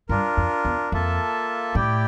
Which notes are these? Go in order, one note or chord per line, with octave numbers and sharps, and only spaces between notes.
G2 D4 F4 A#4
F2
E2
F2 A#3 F4 A4 E5 A5
A2 E4 G4 D5 G5